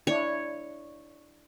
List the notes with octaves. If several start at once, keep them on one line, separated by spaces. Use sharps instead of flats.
D4 E4 C#5